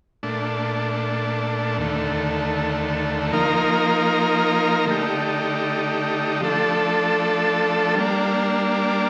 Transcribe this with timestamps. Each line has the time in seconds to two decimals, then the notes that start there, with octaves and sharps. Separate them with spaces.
0.23 A#2 A3 D4
1.78 D#2 D3 A3
3.32 F3 A#3 D#4 A#4
4.87 D3 A3 D#4 G4
6.41 F3 A3 D4 A4
7.95 G3 A#3 D4